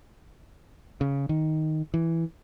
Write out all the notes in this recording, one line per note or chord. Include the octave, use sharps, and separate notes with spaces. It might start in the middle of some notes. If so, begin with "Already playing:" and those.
C#3
D#3
E3